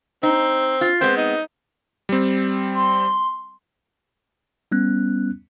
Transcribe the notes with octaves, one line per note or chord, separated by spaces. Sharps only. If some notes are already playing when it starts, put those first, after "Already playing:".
C4 D#4
F4
G#3 B3 C4 C5
D#4
G3 C4
C6
G3 B3 C#4 F#6